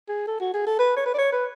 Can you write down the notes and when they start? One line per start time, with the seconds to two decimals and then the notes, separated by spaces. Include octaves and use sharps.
0.08 G#4
0.27 A4
0.40 F#4
0.54 G#4
0.67 A4
0.79 B4
0.96 C#5
1.06 B4
1.14 D5
1.18 C#5
1.32 B4